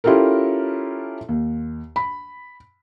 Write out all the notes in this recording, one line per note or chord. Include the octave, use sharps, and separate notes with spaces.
C#4 E4 F4 G4 A4 A#4
D#2
B5